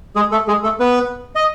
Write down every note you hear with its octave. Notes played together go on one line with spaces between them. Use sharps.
G#3 G#4
A3 A4
G#3 G#4
A3 A4
B3 B4
D#5